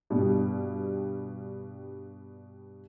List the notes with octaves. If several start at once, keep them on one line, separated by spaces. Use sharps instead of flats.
G2 B2 G3